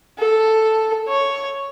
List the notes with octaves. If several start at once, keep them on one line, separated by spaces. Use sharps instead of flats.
A4
C#5